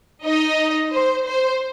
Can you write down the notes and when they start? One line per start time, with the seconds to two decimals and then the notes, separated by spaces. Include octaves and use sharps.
0.24 D#4 D#5
0.93 C5
1.27 C5